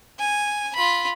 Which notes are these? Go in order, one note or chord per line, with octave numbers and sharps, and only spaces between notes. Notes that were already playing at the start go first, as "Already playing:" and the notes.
G#5
F4 B5